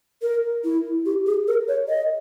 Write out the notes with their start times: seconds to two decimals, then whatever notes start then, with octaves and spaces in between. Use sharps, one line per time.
0.22 A#4
0.64 E4
1.06 G4
1.26 G#4
1.48 A#4
1.68 C#5
1.89 D#5